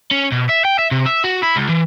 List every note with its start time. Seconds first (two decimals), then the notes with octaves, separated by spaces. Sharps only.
0.11 C#4
0.32 B2
0.49 E5
0.65 G5
0.79 E5
0.91 C3
1.06 E5
1.24 F#4
1.43 E4
1.57 C#2
1.70 E3